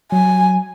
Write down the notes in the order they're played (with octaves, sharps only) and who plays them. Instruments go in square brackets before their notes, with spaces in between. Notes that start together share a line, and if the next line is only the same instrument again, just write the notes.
[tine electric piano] F#3 [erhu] G#5